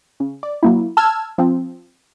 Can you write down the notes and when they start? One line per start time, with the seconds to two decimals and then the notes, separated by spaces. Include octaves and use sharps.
0.20 C#3
0.43 D5
0.63 F#3 A#3 E4
0.97 A5 E6 F6 G#6
1.38 F3 C4